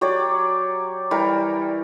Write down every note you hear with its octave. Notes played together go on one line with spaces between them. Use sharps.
F#3 G4 C#5 D5
E3 G3 A#4 G5